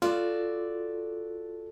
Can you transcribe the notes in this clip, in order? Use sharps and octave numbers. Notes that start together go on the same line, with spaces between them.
F4 F#4 A4 D5